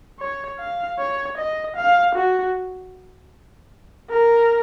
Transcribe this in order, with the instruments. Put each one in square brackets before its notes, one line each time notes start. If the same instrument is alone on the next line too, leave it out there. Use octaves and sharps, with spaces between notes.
[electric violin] C#5
F5
C#5
D#5
F5
F#4
A#4